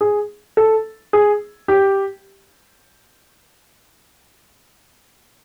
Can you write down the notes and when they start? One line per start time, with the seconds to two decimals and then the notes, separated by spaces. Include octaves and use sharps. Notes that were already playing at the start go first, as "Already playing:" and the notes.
0.01 G#4
0.57 A4
1.13 G#4
1.68 G4